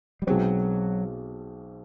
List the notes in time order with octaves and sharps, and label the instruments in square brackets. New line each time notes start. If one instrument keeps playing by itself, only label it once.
[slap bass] G3
[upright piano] B1 B2 G#3 C4 [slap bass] F#3